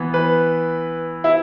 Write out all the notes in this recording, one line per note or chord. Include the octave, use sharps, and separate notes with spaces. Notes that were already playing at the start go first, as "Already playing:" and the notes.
Already playing: E3 B3
B4
E4